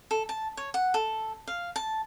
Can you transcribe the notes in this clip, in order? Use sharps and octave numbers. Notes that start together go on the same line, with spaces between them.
A4
A5
C#5
F#5
A4
F5
A5